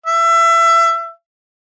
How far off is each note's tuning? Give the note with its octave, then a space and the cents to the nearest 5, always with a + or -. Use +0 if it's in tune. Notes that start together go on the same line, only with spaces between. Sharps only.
E5 +25